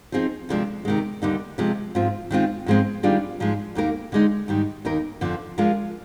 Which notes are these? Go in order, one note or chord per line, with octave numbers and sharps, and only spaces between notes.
F3 C4 D#4 G#4
D2 C3 F3 G#3 D4
C3 D#3 G#3
D#2 D3 G3 A#3 D#4
C3 F3 G#3
G#2 F3 C4 F4
D#3 G#3 C4 F4
G#2 F3 G#3 C4
D#3 G3 D4 F4 G#4
G#2 F3 G#3
D#2 D#3 A#3 F4 A#4
D3 G#3 D#4
G#2 D#3 G3
D#2 D#3 A#3 D#4 A#4
F2 D3 F3
F3 G#3 D4 F4 A#4